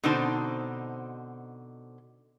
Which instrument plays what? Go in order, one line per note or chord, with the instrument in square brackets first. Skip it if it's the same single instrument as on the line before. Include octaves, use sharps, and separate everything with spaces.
[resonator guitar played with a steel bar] B2 D3 C4 D#4 C5 A5